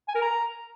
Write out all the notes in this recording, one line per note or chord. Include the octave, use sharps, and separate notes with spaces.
G#5
A#4
A#5